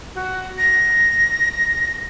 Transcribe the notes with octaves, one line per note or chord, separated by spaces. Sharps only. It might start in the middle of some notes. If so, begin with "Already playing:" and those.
F#4
A#6